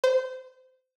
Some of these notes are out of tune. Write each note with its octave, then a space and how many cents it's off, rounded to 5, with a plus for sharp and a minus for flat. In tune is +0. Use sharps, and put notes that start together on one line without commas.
C5 -25